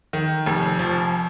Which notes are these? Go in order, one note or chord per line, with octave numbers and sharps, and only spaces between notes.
D#3
F1
F3